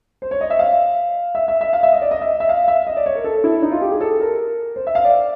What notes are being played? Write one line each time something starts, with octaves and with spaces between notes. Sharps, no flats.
C5
C#5
D#5
E5
F5
E5
E5
E5
F5
E5
D#5
D5
D#5
E5
E5
F5
E5
D#5
D5
C#5
A#4
A4
E4
D#4
F4
G4
G#4
A4
A#4
C5
E5
F5
D5